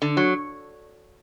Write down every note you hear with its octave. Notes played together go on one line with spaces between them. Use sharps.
D3
F#3